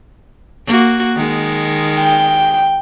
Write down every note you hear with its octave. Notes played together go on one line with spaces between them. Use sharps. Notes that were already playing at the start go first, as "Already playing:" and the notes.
A#3 F#4
D#3 G#3
G5